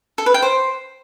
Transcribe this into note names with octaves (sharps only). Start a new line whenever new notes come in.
A4
B4
G5
C5